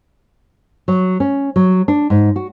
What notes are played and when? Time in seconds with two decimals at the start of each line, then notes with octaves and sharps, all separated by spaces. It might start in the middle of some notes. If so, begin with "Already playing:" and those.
0.88 F#3
1.20 C#4
1.56 F#3
1.88 D4
2.10 G#2
2.36 F#4